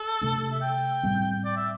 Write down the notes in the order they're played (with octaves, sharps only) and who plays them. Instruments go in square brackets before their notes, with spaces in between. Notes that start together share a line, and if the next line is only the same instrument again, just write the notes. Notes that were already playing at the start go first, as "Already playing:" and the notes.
Already playing: [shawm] A4
[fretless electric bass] C3 A3 D4
[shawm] E5
G5
[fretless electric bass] A2 G3 C4
[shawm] D5
E5